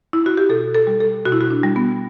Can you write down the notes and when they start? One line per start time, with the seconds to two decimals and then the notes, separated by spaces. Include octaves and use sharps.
0.13 E4
0.26 F#4
0.37 G4
0.49 B2 A4
0.75 A4
0.87 G3
1.00 A4
1.25 B2 F#4
1.32 E4
1.41 F#4
1.50 D4
1.63 G3
1.76 B3